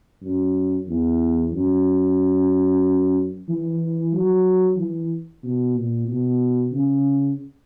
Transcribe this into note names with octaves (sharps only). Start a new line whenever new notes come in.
F#2
E2
F#2
E3
F#3
E3
B2
A#2
B2
C#3